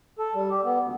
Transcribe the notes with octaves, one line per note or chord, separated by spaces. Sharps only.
A4
G3
G4
B3
D2